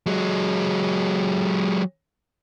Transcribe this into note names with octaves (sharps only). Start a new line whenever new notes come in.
F#3 G#3